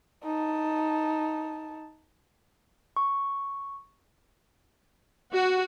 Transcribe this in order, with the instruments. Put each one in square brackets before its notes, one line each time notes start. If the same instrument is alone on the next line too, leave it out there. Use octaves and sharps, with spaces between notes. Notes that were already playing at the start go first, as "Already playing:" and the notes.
[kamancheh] D#4 A5
[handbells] C#6
[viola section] F#4